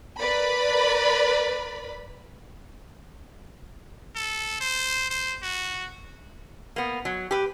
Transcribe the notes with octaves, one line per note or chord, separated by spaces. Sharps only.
A#4 B4 D5 B5
A4
C5
C5
F#4
A#3 B3
F#3
G4 B4